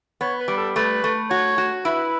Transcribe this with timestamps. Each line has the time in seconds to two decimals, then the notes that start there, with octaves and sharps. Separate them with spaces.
0.21 B3 C#5
0.40 B4
0.48 G3
0.57 A4
0.76 A3 B4
1.04 A3
1.30 F#4 C#5
1.58 F#4
1.85 E4 B4